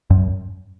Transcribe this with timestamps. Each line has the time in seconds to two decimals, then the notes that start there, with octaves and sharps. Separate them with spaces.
0.10 F#2